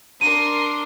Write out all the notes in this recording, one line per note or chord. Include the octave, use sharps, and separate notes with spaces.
D4 A#4 C6 D#7